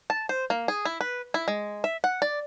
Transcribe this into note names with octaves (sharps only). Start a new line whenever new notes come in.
A5
C5
A#3
G#4
E4
B4
E4
G#3
E5
F#5
D5